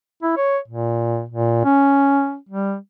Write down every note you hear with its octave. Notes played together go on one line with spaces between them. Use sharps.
E4
C#5
A#2
A#2
C#4
G3